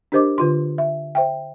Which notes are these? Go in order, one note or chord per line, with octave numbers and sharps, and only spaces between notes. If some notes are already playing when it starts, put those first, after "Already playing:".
D4 G4 A#4 C5 D#5 D6
D3 F4 C6
E5
C5 E5 G5